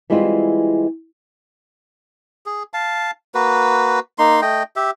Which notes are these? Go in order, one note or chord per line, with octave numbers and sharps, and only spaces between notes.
E3 G3 G#3 C4 E4 F4
G#4
F5 A5
A#3 F#4 B4
A#3 D#4 C6
A3 D#5 G5
G4 E5